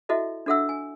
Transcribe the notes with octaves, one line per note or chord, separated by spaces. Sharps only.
E4 F#4 A4 D#5 E5
D4 F#4 A4 E5 F#5 E6
G#5